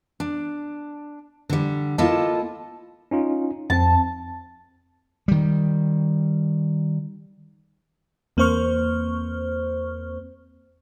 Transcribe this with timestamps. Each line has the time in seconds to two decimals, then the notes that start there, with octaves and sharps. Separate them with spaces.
0.20 D4
1.49 D3 G3
1.98 A#3 E4 F4 A4 D#5 A5
3.11 C#4 D#4 F4
3.70 F2 C4 A5
5.28 D#3 G3
8.37 E2 A#3 C4 C5 C#6 F6